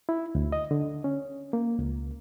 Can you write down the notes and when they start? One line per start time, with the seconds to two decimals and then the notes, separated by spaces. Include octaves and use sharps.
0.09 E4
0.35 D2
0.52 D#5
0.71 D3
1.04 C#4
1.53 A#3
1.79 C#2